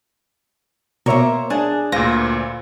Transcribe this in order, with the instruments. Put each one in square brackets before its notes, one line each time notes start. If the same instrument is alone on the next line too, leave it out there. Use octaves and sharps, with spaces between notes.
[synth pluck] B2 [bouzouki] A#3 C5 [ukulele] A#4 C#5 E5
[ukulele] D4 [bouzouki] G#4 A5
[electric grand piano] D2 A#2 [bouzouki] F4 B4 [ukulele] C5 [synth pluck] A#6